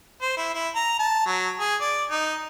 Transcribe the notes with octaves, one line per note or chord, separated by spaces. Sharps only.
C5
E4
E4
A#5
A5
F#3
G#4
D5
D#4